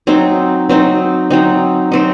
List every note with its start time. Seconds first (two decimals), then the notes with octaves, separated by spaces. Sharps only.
0.07 F#3 C4 D#4
0.69 F#3 C4 D#4
1.30 F#3 C4 D#4
1.92 F#3 C4 D#4